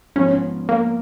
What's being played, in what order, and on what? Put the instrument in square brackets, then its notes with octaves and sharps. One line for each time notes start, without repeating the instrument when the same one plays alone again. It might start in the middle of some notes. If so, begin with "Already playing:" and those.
[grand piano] G#2 F3 B3 [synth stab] C#4
[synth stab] A#3